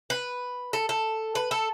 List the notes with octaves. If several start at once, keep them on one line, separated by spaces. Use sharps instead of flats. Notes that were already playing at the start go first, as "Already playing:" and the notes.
B4
A4
A4
B4
A4